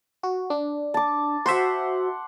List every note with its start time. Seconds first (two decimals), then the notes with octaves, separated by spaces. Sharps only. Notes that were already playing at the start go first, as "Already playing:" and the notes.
0.23 F#4
0.50 D4
0.94 A5 D6
1.46 F#4 C5 E5 F#5 C6